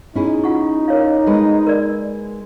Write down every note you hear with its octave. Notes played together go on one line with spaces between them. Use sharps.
C#4 D#4 E4 G#4
F4 F#5 C#6
A#4 C#5 F5
G#3 A#3 B4
A#4 D5